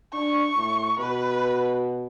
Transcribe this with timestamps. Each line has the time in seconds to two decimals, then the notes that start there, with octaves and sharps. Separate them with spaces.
0.13 D4 C#6
0.56 A2
0.99 B2 B4